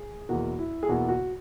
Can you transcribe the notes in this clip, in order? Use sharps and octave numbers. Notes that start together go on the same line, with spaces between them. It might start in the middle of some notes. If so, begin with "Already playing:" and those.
Already playing: G#4
E2 B2 A#3 E4 F#4
E4
G#4
E2 B2 A#3 E4 F#4
F#4